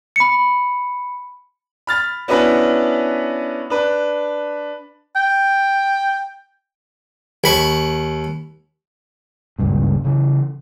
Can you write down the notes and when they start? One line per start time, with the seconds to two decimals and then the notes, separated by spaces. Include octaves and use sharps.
0.16 B5 C#7
1.87 B5 F6 A6
2.28 B3 C#4 D4 E4 F#4 B4
3.70 D4 B4
5.16 G5
7.44 D#2 B5 C#6
9.59 F#1 C#2 G2 A#2
10.05 C#3 E3